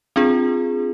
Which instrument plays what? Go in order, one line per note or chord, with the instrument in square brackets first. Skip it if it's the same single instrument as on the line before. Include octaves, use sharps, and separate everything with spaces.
[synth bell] C4 D4 F4 G#4